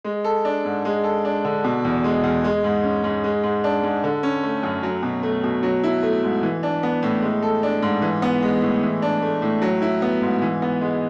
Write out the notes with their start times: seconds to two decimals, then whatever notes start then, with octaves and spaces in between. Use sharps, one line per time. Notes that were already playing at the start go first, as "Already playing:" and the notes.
0.04 G#3
0.24 A4
0.45 D4
0.65 G#2
0.85 G#3
1.04 A4
1.25 D4
1.45 D3
1.64 B2
1.84 E2
2.04 G#3
2.23 E2
2.44 G#3
2.64 G#2
2.83 C#4
3.04 G#2
3.24 G#3
3.44 G#2
3.64 D4
3.83 G#2
4.04 D3
4.23 C#4
4.43 A3
4.63 F#2
4.83 F#3
5.03 B2
5.23 A3
5.44 B2
5.63 F#3
5.83 E4
6.03 A3
6.24 G#2
6.43 E3
6.63 D4
6.83 B3
7.03 A2
7.22 G#3
7.43 A4
7.63 D4
7.83 G#2
8.02 E3
8.22 B3
8.42 G#3
8.62 A2
8.83 E3
9.02 D4
9.22 A3
9.42 A2
9.62 F#3
9.82 E4
10.02 B3
10.22 G#2
10.42 E3
10.62 B3
10.81 G#3